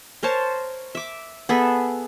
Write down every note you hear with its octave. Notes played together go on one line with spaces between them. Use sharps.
A#4 C5 C#5 A5
E5 D6
B3 G#4 A4 E5